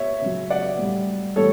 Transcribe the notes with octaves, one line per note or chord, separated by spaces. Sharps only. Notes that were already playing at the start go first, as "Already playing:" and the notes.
Already playing: C#5 E5
C#3 F#3
D5 F#5
A2 G3
A2 E3 G3 A4 C#5